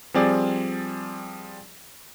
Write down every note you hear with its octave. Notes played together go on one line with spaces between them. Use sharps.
F3 G3 C4 G#4 D5